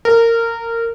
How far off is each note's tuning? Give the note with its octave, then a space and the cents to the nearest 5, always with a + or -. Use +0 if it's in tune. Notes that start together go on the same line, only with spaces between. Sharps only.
A#4 -20